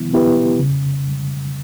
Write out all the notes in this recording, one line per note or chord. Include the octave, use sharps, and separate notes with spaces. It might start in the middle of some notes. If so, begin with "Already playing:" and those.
Already playing: E3 B3 E4
B3 E4 G4 B4
C#3